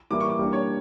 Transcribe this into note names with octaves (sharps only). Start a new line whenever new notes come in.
E3 G3 A#3 E4 D6
C#6
D6
G3 A#3 D4
C#5